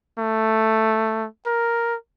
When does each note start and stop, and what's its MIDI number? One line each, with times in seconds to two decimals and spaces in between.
0.19 1.27 57
1.47 1.96 70